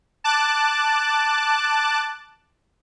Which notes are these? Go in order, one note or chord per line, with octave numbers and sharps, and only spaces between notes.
A5 D6 F#6